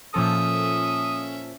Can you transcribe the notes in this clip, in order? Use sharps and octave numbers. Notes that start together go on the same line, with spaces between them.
A#2 F3 C#4 A4 E5 D#6